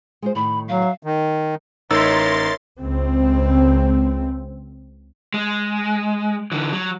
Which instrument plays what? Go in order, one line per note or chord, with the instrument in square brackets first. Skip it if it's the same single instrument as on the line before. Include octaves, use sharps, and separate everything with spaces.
[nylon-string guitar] G#3 F4 C5
[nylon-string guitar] A2 D#3 [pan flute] B5
[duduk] F#3 [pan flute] F5
[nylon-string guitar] E5
[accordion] D#3
[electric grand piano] A1 D#4 E6 [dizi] A#4 [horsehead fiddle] C#5 E5 [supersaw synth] C6 A6
[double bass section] C#2 C4
[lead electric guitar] G#3
D3 E3
F#3